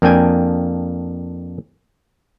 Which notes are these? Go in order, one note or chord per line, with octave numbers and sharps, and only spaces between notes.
F2 A#3 D4 G5 G#5